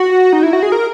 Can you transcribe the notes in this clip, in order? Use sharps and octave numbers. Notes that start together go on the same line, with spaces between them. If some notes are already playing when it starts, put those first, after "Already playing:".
Already playing: F#4
D#4
E4
F#4
G#4
A#4